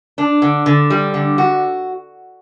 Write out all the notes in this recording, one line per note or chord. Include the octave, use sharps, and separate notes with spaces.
D4
D3
D3
G3
D3
F#4